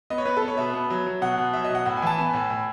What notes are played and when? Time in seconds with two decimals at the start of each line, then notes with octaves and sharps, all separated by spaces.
0.10 B3 D#5
0.18 C#5
0.25 B3 B4
0.37 A4
0.42 B3
0.48 C#5
0.57 B2 E5
0.73 B3
0.90 F#3
1.07 F#3
1.21 B2 F#5
1.37 B2
1.53 F#3 E5
1.65 D#5
1.69 B2
1.75 F#5
1.86 A2 F#5
1.97 G#5
2.02 E3 A5
2.18 B3 G#5
2.34 A2
2.50 A2